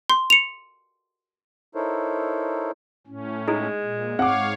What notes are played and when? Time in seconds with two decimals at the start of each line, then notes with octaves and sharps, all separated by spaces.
0.10 C6
0.30 C#7 F7
1.75 D#4 E4 A4 A#4 C5 C#5
3.07 A2 C#4
3.48 G#3 D#4 E4 G#4
3.81 A#2
4.19 G#2 C4 C#5 F5 F#5 D6